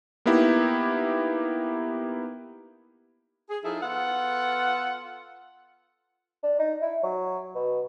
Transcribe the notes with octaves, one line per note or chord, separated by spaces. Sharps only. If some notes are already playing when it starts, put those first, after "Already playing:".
A#3 B3 D#4 E4 G4
G#4
F3 D#4 E4 G#4 A4
B3 F4 A4 F#5
D4
D#4
E4
F#3
B2